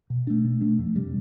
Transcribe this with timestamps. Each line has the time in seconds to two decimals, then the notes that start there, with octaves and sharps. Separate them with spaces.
0.10 B2
0.27 A3 D4
0.44 B2
0.61 A3 D4
0.78 F2
0.96 C3 G3